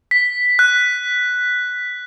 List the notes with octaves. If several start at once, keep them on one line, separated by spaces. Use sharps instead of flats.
B6
F#6